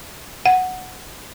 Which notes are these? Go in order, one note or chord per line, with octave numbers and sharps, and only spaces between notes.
F#5